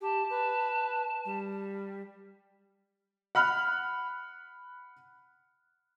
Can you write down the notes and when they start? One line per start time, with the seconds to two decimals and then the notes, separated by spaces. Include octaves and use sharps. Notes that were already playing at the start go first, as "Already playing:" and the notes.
0.01 G4 A5
0.30 B4
1.25 G3
3.35 F#5 B5 F6 F#6